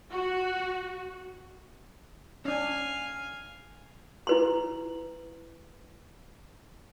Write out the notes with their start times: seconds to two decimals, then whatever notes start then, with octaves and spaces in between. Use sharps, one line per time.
0.12 F#4
2.45 C#4 D4 F5 G#5
4.27 E4 B4 C6